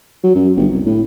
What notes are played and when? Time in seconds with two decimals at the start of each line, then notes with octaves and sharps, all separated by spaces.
0.23 F#3
0.35 F#2
0.56 G1
0.71 C2
0.85 A2